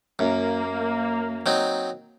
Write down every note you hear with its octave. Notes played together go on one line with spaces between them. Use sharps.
F#2 A#3
F#3 C4 D#4